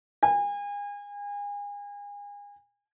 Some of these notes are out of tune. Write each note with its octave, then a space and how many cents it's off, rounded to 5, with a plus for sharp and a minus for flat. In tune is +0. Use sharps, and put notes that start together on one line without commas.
G#5 -35